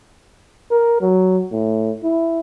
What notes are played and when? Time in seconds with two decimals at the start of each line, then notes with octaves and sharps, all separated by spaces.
0.71 A#4
1.01 F#3
1.52 A2
2.03 E4